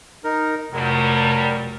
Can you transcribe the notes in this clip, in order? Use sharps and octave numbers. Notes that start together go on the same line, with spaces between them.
D#4 A#4
F1 G2 F#3 G3 A#4